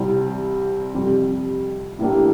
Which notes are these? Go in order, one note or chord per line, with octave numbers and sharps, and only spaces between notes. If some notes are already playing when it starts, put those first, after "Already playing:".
Already playing: C2 C3 G3 C4
F2 C3 G3
A2 E3 A#3 D4 G4